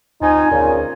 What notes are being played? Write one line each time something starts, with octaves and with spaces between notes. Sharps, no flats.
D2 C4 D#4 F4 G#5
D2 A#2 C#3